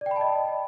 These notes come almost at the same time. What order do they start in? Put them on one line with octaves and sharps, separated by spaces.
D5 G5 B5 A5 D#5